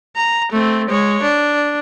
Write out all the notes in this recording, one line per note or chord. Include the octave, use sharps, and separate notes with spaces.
A#5
A3 C4
G#3 C#5
D4